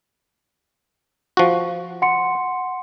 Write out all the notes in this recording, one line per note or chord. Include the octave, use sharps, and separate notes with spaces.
F3 F#4
F#5 C6 C#7